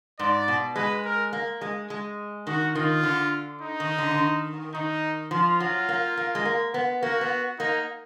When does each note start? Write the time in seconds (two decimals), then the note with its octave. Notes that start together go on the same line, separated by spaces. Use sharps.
0.19 G#2 D5
0.48 B2
0.75 G#3 B4
1.05 A#4
1.33 A#3
1.61 G#3
1.90 G#3
2.47 D#3 F#4
2.75 D#3 F4
3.03 D3
3.61 D#4
3.80 D#3
3.98 D3
4.11 D3
4.18 D#3
4.74 D#3 D#4
5.31 F3 F4
5.60 F#3
5.89 A#3
6.17 A#3
6.35 G#3
6.45 A#3
6.74 B3
7.03 A#3 F#4
7.21 B3
7.59 A#3 D#4